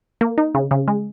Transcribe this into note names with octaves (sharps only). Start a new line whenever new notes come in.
A#3
D#4
C#3
C#3
G#3